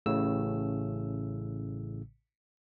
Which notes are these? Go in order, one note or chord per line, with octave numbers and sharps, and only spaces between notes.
A1 A2 C#3 E6